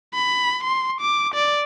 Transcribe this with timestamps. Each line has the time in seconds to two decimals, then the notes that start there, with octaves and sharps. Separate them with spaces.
0.14 B5
0.64 C6
1.01 D6
1.35 D5